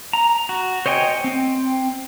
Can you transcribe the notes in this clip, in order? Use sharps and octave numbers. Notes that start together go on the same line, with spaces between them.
A#5
F#4
C5 C#5 D#5 G5 G#5
C4